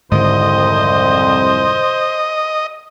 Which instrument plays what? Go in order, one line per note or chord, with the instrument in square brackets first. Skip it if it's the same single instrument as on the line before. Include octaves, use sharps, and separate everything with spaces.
[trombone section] C2 F2 [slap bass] G#2 D3 D#3 [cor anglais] C5 [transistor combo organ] D#5